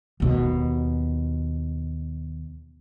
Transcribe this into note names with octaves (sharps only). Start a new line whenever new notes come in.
D#2 B2